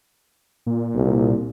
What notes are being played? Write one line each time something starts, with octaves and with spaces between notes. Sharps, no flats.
A#2
C2